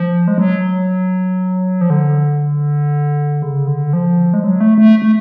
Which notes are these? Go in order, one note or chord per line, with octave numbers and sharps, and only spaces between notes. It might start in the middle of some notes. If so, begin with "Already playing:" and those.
Already playing: F3
G#3
F#3
F3
D3
C#3
D3
F3
G#3
F#3
A3
A3
A3